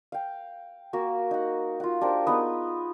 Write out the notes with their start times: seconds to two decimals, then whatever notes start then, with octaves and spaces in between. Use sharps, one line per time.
0.12 F5 G5
0.93 A#3 F#4
1.31 D#4 F#5
1.80 F4 F#5
2.01 D4 G4 A#4 C5
2.27 B3 D#4 G#4 B4